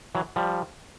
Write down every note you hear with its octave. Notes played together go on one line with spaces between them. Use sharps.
E3 F#3
F3 G3